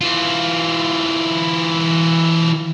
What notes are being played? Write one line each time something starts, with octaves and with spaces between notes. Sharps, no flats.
E3 F4